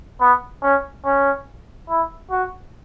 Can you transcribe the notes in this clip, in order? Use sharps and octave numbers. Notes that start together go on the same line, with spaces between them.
B3
C#4
C#4
E4
F#4